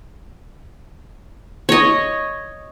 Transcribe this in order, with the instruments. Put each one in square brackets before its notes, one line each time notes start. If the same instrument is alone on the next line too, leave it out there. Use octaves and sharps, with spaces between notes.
[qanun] C#5 D#5